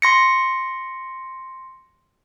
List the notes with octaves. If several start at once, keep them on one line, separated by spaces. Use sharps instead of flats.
C6 A#6 C#7